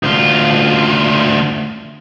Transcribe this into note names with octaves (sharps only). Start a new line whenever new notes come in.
D2 F4